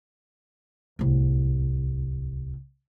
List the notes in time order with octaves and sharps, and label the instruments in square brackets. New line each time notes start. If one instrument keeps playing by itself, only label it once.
[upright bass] D1 C2